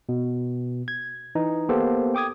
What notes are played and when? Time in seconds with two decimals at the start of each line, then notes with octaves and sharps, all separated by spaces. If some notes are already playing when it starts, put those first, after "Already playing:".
0.09 B2
0.88 G#6
1.35 E3 D#4
1.69 A#3 B3 G4 A4 C5
2.15 G5 D6 D#6 G#6